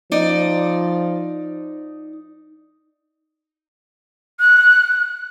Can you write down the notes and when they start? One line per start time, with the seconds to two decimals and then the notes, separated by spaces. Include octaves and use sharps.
0.12 F3 D#4 D5
4.40 F#6